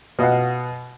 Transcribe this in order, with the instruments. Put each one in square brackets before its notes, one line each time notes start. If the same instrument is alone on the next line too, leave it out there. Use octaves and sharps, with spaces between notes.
[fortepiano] B2 D#5 F5 F#5